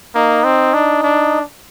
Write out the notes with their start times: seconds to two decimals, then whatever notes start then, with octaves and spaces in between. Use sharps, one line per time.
0.15 A#3 D#4
0.44 C4
0.74 D4
1.03 D4